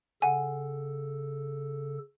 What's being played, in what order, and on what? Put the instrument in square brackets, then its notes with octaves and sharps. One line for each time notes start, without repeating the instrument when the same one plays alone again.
[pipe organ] C#3 A4 [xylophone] F#5 G#5